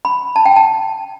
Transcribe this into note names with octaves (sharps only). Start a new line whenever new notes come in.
B5
A5
G5
A5